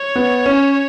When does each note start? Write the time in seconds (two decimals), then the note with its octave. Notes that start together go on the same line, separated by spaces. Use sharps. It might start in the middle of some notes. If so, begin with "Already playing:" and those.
Already playing: C#5
0.16 B3
0.46 C#4